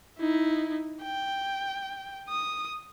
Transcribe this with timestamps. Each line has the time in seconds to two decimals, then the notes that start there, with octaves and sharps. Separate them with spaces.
0.19 D#4 E4
1.02 G5
2.29 D#6